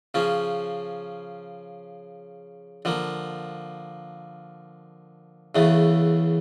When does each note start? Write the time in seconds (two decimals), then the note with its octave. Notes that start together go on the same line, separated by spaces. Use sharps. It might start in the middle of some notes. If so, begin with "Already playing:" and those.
0.14 C#3 F3 C#4
2.85 D3 F3 A#3
5.55 E2 C#3 E3 A3